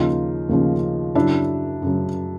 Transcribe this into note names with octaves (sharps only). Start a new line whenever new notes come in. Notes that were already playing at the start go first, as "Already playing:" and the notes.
Already playing: D#2 C#3 F3 D#4 F4
D#2 C#3 F3
F#2 C#3 F#3 D4 E4
F#2 C#3 F#3